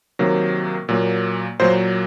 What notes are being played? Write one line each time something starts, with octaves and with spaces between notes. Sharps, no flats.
C3 D#3 F#3 A#3
A#2 F#3 A#3
A#2 F#3 A#3 C5